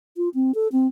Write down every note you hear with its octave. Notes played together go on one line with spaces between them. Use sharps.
F4
C4
A4
C4